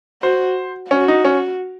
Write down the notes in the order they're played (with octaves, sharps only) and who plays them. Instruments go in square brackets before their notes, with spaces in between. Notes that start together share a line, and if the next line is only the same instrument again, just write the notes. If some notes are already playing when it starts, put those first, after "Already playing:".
[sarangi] F#4 [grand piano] C5
[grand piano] C#4 [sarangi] F#4
[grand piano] D#4
C#4